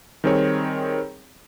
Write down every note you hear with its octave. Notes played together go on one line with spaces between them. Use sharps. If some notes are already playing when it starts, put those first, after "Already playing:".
D#3 G3 C4 G#4 A#4 C#5